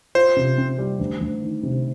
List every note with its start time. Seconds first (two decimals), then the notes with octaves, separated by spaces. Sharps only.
0.15 F4 C5
0.36 C3
0.58 C4
0.79 G3
0.99 D2
1.21 D2
1.42 D#3
1.63 C3